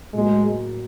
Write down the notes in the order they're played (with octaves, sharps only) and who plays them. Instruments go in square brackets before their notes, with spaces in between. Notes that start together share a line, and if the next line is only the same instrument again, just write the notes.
[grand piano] A2 F#3 A#3 [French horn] G#3